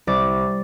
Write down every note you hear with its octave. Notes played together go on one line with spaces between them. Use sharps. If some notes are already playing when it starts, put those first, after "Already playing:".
C2 D5